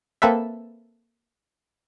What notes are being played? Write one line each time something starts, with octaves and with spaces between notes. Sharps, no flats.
A#3 C4 A4 B4 E5